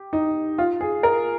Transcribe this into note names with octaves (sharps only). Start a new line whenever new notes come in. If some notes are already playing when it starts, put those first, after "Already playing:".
Already playing: G4
D#4
F4
G#4
A#4